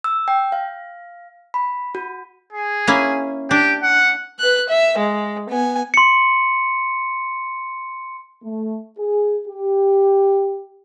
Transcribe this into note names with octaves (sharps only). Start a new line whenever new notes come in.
E6
G5
F5
B5
F#4
G#4
A#3 C#4 E4
D4 G4
F#5
B4 F#6
E5
G#3
B3 G#5
C6 C#7
A3
G#4
G4